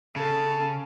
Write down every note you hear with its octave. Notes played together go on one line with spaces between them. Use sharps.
C#3 A4 A5